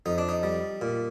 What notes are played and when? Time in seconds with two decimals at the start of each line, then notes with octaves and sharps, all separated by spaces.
0.06 F2 D#4
0.18 D4
0.29 D#4
0.43 G3
0.81 A#2